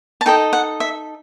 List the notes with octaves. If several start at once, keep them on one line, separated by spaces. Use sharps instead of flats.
A5
D#4 A4 D#5 G5
F#5
E5